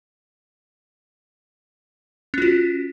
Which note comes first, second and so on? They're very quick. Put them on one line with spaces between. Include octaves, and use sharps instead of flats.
C#4 F4 F#4